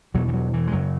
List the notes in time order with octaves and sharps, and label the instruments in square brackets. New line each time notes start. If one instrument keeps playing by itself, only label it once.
[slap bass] E2 B2 F#3
E3
F#3
E3
G#3
F#2 C#3 F#3